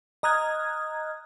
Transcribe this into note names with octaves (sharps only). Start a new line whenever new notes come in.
D#5 A#5 D#6 F6 F#6 G#6